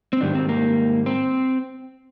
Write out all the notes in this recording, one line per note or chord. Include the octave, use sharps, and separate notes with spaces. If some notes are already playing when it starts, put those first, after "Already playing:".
C4
G#2 D#3 G3 D4
C4
A#3
C4